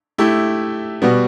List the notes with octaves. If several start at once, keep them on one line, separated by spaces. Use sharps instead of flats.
A3 E4 G4
B2 G3 B3 F#4